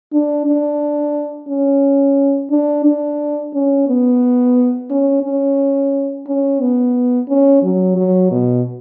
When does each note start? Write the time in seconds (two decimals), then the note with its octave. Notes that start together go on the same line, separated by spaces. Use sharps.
0.13 D4
0.47 D4
1.49 C#4
2.51 D4
2.85 D4
3.54 C#4
3.88 B3
4.90 C#4
5.24 C#4
6.27 C#4
6.61 B3
7.29 C#4
7.63 F#3
7.97 F#3
8.31 B2